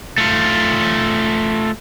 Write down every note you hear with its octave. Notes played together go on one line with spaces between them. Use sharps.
A3 F4